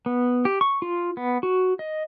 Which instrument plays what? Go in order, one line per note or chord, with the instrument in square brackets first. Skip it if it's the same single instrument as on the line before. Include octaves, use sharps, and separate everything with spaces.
[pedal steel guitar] B3
G4
C#6
F4
B3
F#4
D#5